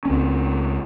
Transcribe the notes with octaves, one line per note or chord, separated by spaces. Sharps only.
C#2 C4 C#4